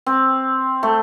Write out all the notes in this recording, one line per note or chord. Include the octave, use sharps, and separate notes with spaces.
C4
A3